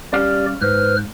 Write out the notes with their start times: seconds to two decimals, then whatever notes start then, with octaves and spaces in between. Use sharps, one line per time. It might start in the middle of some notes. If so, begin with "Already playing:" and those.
0.13 G3 C#4 G4 D5 F5
0.61 G#2 B4 C5 F6